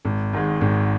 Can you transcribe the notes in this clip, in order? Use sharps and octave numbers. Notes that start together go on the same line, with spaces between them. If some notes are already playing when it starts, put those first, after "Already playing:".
G#1
G#2 D#3 G#3
G#1